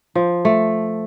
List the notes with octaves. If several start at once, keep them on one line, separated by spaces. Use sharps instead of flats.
F3
A3